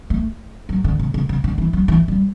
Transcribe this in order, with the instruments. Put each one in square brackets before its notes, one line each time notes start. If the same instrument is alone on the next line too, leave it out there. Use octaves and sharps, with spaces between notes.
[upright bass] A3
F#3
D3
C#3
C#3
C#3
D3
E3
F#3
E3
G3